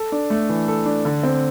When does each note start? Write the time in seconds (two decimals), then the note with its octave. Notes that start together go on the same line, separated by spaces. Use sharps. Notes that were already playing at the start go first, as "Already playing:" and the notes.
Already playing: A4
0.12 D4
0.30 A3
0.49 E3
0.68 A4
0.86 D4
1.05 D3
1.23 C4